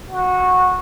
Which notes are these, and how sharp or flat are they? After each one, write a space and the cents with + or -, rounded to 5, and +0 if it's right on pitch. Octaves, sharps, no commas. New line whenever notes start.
F#4 -15